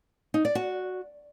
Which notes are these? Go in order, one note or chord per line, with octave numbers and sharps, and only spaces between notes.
D#4
D5
F#4